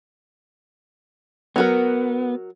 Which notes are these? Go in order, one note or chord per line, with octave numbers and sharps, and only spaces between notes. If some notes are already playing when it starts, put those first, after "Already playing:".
F#3 B3 F#4 A#4